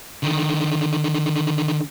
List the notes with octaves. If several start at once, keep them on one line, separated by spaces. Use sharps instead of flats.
D3 D#3